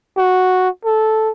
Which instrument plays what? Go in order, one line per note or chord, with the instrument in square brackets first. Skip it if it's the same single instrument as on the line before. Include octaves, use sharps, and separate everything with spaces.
[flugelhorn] F#4
A4